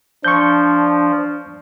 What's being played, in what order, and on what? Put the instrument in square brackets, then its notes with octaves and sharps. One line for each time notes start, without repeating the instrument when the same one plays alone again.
[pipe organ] F3 [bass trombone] D4 [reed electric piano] C#6 G6